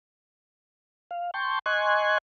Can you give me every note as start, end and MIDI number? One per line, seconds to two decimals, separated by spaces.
1.11 1.31 77
1.34 1.59 79
1.34 1.59 81
1.34 1.59 84
1.34 1.59 85
1.34 1.59 91
1.66 2.18 75
1.66 2.18 80
1.66 2.18 84
1.66 2.18 85
1.66 2.18 90
1.66 2.18 92